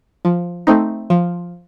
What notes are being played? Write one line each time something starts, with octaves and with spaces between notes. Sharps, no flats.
F3
A3 C4 D#4
F3